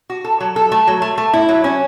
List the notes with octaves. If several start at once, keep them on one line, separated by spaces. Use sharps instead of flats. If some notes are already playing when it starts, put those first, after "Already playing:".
F#4
A4
F#3
A4
A3
F#3
A3
A3
E4
F#3
C#4